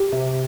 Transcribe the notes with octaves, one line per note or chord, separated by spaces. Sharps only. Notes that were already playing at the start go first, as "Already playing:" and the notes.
Already playing: G4
C3